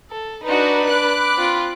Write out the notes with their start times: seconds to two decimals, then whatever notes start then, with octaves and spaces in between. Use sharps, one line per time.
0.11 A4
0.44 D4 D#4 F#4 B4
0.87 B5 D6 F#6
1.37 C4 F4